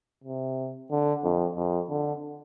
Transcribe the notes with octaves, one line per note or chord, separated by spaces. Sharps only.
C3
D3
F2
F2
D3